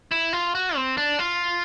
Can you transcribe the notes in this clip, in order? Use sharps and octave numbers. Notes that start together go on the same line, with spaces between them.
E4
F4
F#4
C4
D4
F4